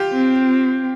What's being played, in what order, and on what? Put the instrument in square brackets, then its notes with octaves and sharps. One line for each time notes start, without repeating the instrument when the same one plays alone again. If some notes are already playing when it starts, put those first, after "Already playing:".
Already playing: [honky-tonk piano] F4 G4
[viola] C4